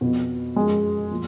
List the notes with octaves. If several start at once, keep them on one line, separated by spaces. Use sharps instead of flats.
F2 B2 F3 B3
F#2 F3 G#3 G#4
A#2 F3